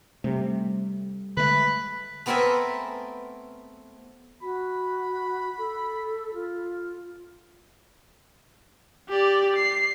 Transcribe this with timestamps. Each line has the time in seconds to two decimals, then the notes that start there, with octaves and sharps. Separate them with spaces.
0.24 C3 G3 A3
1.37 D3 G#3 A3 B4
2.26 A3 B3 C4 A#4 E5 G#5
4.42 F#4 B5
5.58 A4
6.34 F4
9.09 G4 D5
9.56 C7